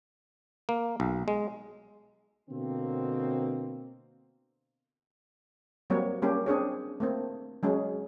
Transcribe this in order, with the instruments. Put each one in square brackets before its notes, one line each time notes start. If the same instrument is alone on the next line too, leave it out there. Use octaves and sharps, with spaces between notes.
[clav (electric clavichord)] A#3
B1
G#3
[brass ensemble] B2 D3 A#3 C4
[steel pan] F#3 G3 A#3 C4 C#5
G3 A#3 C#4 G4
C4 D4 G#4 C#5
A3 A#3 C4
F#3 G#3 C#4